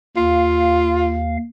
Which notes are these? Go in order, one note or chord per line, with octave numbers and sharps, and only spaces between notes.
D#2 F4 F5